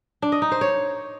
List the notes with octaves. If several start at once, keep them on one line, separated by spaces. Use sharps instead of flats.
D4
D#5
D#4
C5
C#5